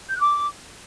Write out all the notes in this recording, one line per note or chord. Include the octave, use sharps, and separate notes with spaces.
G6
F#6
D6